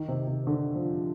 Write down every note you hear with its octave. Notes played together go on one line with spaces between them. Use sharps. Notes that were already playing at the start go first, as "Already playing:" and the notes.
Already playing: D#3
C3
C3
D3
F3